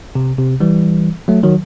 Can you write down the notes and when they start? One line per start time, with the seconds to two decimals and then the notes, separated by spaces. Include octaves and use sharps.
0.15 C3
0.38 C3
0.60 E3 G3
1.28 F#3 A3
1.43 D#3 F#3